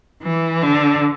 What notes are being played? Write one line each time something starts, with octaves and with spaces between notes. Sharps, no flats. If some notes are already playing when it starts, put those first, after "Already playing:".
E3
D3